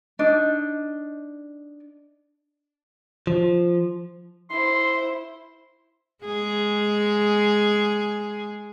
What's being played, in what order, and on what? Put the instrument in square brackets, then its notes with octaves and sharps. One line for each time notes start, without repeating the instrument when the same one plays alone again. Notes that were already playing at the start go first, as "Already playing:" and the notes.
[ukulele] D4 D#4
[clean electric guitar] F3
[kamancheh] E4 C5 [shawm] C6
[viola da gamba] G#3 G#4